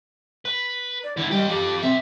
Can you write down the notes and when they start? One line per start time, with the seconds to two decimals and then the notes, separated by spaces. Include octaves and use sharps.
0.45 B4
1.04 D5
1.17 D3 B3 E4
1.31 G3 G4 D#5
1.49 F3 G4 A4
1.82 B1 C4 E5